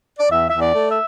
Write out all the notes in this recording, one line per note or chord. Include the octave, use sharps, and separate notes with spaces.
D5
E2 E5
E2 E5
D5
A3
E5